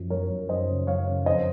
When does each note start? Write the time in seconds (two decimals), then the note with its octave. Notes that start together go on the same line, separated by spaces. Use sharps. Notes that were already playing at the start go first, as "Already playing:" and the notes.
Already playing: F#2 F3
0.10 F#2 A#4 C#5
0.30 F#2
0.49 F#2 C5 D#5
0.68 C#3
0.87 F#2 C#5 F5
1.07 C#3
1.26 F2 C5 D#5